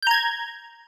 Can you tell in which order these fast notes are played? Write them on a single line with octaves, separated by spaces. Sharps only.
G6 A#5 G#6